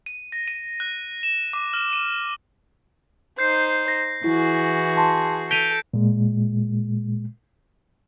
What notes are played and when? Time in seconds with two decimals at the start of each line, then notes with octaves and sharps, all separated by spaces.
0.06 D#7
0.32 A#6
0.48 D#7
0.80 F#6
1.23 E7
1.53 D6
1.74 F6
1.93 D#7
3.39 D#4 C5 G6 C7
3.88 A#6
4.24 E3 E4 F#4 G#4
4.97 A5 C6
5.51 A4 G6 B6 D7 D#7 F7 G7
5.94 A#2 G#3